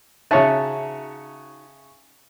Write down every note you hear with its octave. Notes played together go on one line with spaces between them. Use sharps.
C#3 D#4 F#4 C#5 E5 A5